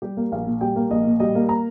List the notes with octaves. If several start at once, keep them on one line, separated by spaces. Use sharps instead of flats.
G3 G4
A#3
A#1 F5
A#2
G3 G5
A#3
A#1 D#5
A#2
G3 D#5
A#3
A#5